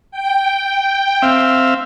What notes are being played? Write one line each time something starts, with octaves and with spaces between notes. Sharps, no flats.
G5
C4 E5 F5